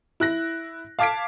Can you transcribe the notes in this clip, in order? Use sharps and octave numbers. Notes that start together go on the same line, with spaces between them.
E4 F#6 A#6
F5 A5 D6 G#6 B6 D7